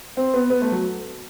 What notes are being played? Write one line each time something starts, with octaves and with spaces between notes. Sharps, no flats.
C4
B3
B3
A3
F#3